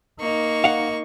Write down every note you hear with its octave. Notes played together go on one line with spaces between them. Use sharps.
A#3 D#4 C#6
F5 F#5